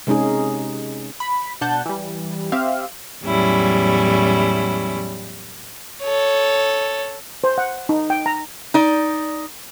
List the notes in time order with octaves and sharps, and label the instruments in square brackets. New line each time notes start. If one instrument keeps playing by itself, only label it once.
[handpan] C3 G#3 C#4 D#4 G#4
[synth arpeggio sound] B5
B2 D4 F#5 A5 G6
E3 G3
C4 G4 E5 F5
[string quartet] E2 A2 F#3 G3 C#4 E4
[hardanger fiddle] A4 C#5
[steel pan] C5
F#5
D#4
G5
A#5
[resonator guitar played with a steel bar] D#4 D5